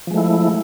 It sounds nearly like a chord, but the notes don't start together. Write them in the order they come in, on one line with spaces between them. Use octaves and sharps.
F3 G#3 A3 E4